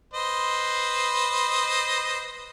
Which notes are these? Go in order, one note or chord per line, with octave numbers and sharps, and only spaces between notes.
B4 C5 D#5